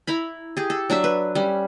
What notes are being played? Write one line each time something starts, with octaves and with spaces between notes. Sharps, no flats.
E4 A#5 B5
G4 G#4
A4
F#3 D4 A4 E5
B4
G3 C#4